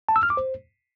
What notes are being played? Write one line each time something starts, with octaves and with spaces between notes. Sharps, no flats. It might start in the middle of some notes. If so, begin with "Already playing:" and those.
A5
E6
F6
D6
C5